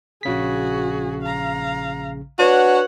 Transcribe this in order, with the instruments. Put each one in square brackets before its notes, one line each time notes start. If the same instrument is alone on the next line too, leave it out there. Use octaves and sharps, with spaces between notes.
[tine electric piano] A#1 C#3 B6 [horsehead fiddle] F#4 G#4
[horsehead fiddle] F5 A#5
[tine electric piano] D4 [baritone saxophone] F#4 [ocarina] B4 [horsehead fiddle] C#5 F#5